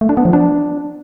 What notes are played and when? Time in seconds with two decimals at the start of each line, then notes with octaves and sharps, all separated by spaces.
0.01 A3
0.09 D4
0.17 B3
0.25 F3
0.33 D4